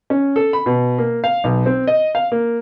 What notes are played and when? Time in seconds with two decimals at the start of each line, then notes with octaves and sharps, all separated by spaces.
0.10 C#4
0.36 A4
0.53 B5
0.66 B2
0.99 A#3
1.24 F5
1.44 B1
1.66 C4
1.87 D#5
2.15 F5
2.32 A#3